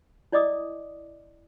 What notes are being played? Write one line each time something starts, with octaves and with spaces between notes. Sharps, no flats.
E4 D5 D#5 D6 D#6